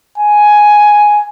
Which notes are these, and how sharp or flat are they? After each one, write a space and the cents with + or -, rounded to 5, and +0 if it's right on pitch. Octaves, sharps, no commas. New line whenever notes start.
G#5 +5